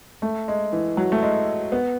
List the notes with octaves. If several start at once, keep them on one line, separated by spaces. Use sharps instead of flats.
A3
G#3
E3
F#3
A3
G#3
B3